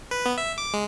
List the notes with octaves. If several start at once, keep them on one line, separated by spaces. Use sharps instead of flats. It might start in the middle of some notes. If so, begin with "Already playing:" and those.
B4
B3
E5
D6
G#3